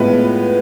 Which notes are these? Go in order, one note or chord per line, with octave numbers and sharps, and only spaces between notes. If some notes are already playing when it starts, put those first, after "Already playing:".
Already playing: A2 G#3 B3 F4 B4